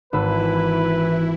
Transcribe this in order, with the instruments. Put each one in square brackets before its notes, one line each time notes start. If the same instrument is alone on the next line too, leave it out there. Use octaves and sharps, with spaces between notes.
[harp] G#1 B5 E6 [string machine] E3 E4 [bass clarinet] B4